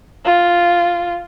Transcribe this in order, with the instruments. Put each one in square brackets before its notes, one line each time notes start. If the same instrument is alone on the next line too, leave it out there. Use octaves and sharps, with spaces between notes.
[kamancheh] F4